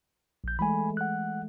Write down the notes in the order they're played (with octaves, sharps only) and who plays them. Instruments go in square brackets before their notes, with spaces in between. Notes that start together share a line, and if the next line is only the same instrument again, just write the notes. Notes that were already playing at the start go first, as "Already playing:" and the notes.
[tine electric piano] A#1 G6
[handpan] E3 G#3 A3 [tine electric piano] G#5 B5
[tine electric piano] F#5 F#6